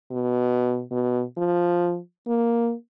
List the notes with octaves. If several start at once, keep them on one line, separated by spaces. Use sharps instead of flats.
B2
B2
F3
A#3